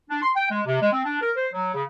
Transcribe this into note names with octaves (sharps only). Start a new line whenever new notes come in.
D4
C6
G5
G#3
C3
G#3
C4
D4
A#4
C5
F#3
C#3